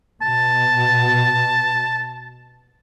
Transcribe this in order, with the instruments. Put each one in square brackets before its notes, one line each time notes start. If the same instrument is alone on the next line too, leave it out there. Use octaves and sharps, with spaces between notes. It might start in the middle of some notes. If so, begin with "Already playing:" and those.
[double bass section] B2 [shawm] A5